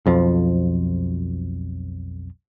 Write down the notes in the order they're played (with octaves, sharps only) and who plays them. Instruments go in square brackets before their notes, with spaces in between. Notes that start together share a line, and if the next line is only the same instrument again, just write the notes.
[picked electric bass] B1 F2 F3